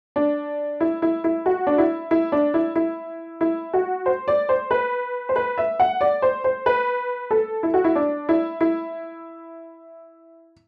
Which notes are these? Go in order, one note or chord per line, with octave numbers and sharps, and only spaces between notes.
D4
E4
E4
E4
F#4
D4
E4
E4
D4
E4
E4
E4
F#4
C5
D5
C5
B4
C5
B4
E5
F#5
D5
C5
C5
B4
A4
E4
F#4
E4
D4
E4
E4